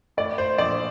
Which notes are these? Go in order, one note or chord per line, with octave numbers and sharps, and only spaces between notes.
A2 D5
C5
A#1 D5